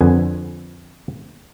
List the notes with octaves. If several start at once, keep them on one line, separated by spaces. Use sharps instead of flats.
F2 D3 B4 G#5